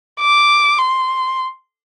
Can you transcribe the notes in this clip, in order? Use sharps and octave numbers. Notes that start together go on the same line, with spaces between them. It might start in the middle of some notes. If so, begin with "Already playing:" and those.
D6
C6